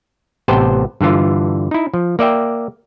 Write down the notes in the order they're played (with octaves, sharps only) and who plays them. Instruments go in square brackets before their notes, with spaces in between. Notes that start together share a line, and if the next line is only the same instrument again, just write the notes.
[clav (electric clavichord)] A1 C3 B3 C5 G5 A5
G2 D3 E3 F4
D#4 E4
F3
A#3 D5 E5 G5